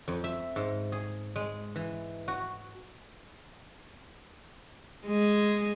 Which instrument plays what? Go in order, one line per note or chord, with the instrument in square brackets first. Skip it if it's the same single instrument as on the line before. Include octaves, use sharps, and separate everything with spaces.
[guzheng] F2
E5
G#2
G#4
G#3
E3
F#4
[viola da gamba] G#3